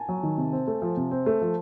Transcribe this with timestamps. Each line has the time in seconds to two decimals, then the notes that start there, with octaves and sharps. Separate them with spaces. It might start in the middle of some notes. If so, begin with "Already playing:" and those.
Already playing: G#5 A5
0.09 F#3
0.23 D#3
0.38 C3
0.52 C4
0.67 A3
0.82 F3
0.97 C3
1.11 C4
1.26 A3
1.42 F3